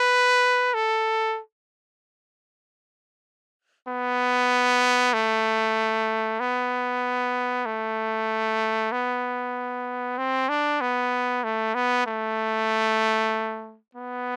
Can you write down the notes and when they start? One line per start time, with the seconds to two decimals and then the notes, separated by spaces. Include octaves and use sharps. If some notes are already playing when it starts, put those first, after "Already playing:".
Already playing: B4
0.74 A4
3.88 B3
5.13 A3
6.40 B3
7.66 A3
8.92 B3
10.18 C4
10.49 D4
10.81 B3
11.44 A3
11.75 B3
12.06 A3
13.95 B3